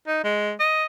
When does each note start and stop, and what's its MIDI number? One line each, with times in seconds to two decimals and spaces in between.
0.08 0.24 63
0.24 0.52 56
0.60 0.86 75